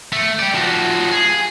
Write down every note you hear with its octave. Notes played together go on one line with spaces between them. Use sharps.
A3
G4 D5
F3 F#4
G#4